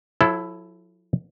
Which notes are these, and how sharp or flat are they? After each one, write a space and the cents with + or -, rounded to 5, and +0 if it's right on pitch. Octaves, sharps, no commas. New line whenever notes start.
F#3 -45 E4 +10 A4 -20